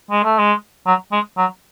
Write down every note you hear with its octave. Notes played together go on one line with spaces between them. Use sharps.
G#3
A3
G#3
F#3
G#3
F#3